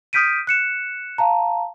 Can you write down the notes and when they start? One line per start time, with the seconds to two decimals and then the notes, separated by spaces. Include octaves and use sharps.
0.13 D#6 F6 G6 B6 D7 D#7
0.47 F#6 C#7 E7
1.18 F5 A5 A#5